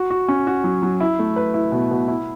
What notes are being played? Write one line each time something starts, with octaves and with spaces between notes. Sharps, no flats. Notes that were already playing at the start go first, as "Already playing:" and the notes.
Already playing: F#4
F#4
C#4
F#4
F#3
F#3
E4
A3
B4
E4
B2
B2
E4